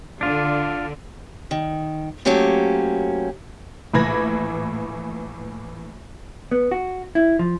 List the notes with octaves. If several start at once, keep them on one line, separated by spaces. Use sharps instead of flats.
D3 D4 F4
D#3
F#3 A3 A#3 C#4 G4 C5
A#1 A2 E3 B5 G#6 A#6
B3
F#4
E4
F3